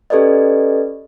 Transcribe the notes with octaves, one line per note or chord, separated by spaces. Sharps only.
C#4 G4 A4 B4 D5 D#5